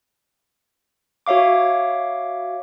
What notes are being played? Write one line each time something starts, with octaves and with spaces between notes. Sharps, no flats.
F#4 C#5 E5 F5 D6